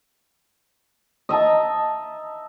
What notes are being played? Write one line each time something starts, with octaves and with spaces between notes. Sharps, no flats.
D#5 E5 A5 A#5